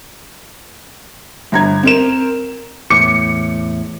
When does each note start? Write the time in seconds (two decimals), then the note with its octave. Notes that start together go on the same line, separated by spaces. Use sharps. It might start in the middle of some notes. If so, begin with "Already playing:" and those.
1.52 G1 A#5 G#6
1.83 C4 A#4 E7
2.90 E2 A2 D6 C#7